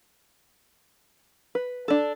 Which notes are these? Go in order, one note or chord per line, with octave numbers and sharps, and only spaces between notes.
B4
D4 A4